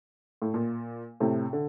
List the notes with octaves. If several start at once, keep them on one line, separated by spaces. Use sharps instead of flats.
A2
A#2
A2 C3
D3